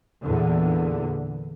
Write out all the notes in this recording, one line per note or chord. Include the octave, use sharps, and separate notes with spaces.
E2 A#2 D3